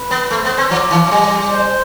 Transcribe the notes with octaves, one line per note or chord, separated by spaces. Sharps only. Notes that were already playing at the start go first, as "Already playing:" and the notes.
Already playing: B4
B3
A3 C5
B3
C4
F3 D5
E3
F3
G3
C5